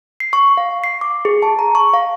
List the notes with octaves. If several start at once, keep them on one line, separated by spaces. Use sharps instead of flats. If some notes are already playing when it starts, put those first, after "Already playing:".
C7
C#6
F5
C7
D6
G#4
A5
A#5
C#6
F5